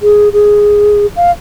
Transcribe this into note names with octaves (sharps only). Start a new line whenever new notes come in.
G#4
G#4
F5